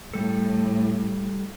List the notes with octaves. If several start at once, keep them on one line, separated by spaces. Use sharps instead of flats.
A2 G3 A4